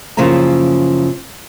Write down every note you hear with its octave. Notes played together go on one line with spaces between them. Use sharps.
F#2 C#3 F3 A#3 E4 A#5